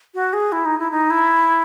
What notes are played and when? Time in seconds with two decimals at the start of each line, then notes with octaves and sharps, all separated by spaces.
0.14 F#4
0.33 G#4
0.52 E4
0.65 D#4
0.79 E4
0.91 D#4
1.10 E4